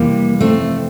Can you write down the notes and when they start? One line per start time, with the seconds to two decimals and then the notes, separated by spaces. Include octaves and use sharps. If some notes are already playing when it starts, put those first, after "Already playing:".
Already playing: F2 C3 E3 G3 A#3
0.41 A3 C4